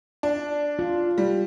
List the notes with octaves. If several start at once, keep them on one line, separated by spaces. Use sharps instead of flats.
D4
F4
G3